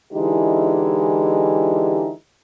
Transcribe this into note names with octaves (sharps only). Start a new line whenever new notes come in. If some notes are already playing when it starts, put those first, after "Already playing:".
D3 E3 G#3 D#4 E4 G4